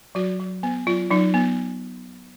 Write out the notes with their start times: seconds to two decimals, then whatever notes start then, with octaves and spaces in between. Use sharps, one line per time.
0.15 F#3 F#4
0.40 F#3
0.63 B3
0.87 F#3 F4
1.10 F#3 D#4
1.34 B3